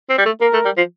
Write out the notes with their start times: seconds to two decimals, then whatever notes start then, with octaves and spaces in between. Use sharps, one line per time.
0.10 C4
0.18 G3
0.26 A3
0.41 A#3 A#4
0.53 A3
0.65 G3
0.77 F3